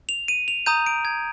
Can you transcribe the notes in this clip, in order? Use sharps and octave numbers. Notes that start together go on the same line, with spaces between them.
F7
D#7
F7
A#5 D#6 G6 D#7
D7
G#6